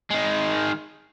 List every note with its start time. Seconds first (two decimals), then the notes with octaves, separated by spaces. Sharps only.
0.11 D#3 G#3